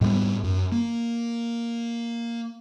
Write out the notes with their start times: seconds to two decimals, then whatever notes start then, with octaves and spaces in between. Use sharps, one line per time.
0.01 G#2 G3 G#3 B3
0.44 F#2
0.72 A#3